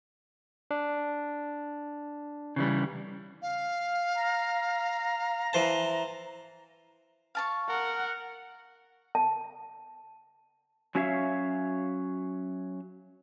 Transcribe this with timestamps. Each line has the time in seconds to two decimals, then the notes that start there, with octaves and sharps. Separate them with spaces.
0.71 D4
2.56 C#3 E3 G3
3.42 F5
4.16 A#5
5.53 E3 C5 A5
7.35 F5 A5 C#6
7.69 A#4 F#5
9.15 A5
10.95 F#3 C#4 F#4 C#5 E5 F5